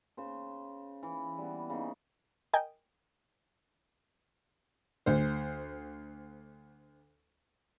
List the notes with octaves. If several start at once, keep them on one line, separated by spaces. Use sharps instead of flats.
C#3 C5
E3
G3 B3
C#3 A#3 D#4
A#4 D#5 G5 G#5
D2 C5